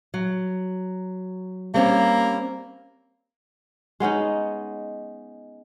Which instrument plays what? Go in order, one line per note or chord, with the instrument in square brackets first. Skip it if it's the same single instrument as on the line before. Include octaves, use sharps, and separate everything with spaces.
[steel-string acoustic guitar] F#3
[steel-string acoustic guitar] G3 C4 C#4 [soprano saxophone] A#3
[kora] G#3 B3 C#4 D#4